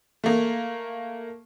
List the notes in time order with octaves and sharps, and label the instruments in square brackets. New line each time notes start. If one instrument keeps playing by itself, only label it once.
[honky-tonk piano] A3 A#3